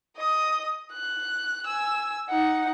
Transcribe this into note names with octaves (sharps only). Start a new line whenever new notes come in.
D#5 D#6
F#6
G#5 E6
D#4 F#5